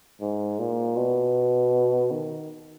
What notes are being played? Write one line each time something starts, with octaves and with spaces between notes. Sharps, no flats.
G#2
A#2
B2
D#3